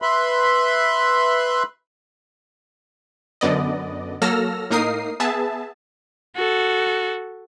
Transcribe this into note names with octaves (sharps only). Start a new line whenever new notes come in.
B4 E5 B5 C6
F#2 D3 B3 D5 D#5
F#3 A#3 A4 E6 F6 A#6
A2 A#3 D#4 A#4 D#6 C7
B3 G#4 E5 A5
F#4 A4